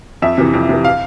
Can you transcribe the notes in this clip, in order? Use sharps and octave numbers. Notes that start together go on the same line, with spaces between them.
F2 E5
C3 E3
F2
C3 E3
F5